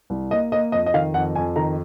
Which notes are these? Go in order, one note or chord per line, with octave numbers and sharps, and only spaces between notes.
C2
A#3 D#5
A#3 D#5
F2 D#5
D#5
D#3 F5
F2 F#5
F2 G#5
D#3 A#5